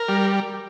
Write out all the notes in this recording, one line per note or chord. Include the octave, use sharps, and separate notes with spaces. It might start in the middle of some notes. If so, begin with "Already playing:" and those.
Already playing: A#4
G3